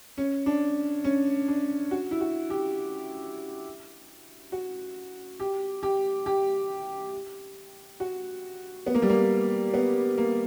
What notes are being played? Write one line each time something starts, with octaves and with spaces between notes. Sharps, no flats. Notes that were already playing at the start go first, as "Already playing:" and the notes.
C#4
D4
C#4
D4
F#4
E4
F#4
G4
F#4
G4
G4
G4
F#4
B3
A#3
G3
A#3
B3
A#3